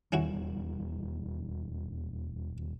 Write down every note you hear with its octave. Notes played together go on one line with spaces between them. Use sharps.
D#1 E2 G3 C#4 E4 F#4